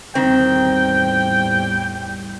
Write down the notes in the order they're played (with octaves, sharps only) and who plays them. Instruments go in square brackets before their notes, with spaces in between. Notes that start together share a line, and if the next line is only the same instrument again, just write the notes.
[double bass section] E2 A2 G3 [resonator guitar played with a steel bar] D#3 C4 [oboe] G5